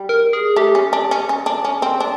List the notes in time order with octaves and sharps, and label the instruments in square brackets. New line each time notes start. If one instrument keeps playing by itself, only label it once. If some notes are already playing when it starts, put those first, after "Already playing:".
Already playing: [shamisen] G3
[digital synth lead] A#4
G#4
[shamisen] A3 [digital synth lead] G4
[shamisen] C#4
D4
C#4
C#4
D4
C#4
C4
D4